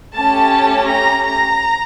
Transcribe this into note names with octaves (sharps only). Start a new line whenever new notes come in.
A3 C#4 G4 A5
A#5
A#5